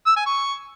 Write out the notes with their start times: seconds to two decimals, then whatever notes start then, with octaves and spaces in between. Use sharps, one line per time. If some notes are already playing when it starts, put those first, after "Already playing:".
0.06 E6
0.16 G#5
0.26 C#6